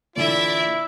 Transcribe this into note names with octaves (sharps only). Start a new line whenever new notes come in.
A#2 D3 E3 E4 D5 E5